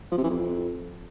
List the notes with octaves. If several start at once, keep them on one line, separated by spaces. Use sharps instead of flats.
F3
C3
E3
F2